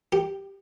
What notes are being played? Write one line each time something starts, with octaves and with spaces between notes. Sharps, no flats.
G4